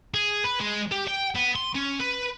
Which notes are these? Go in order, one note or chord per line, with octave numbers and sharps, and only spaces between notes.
G#4
B4
G#3
G4
G5
B3
C6
C#4
B4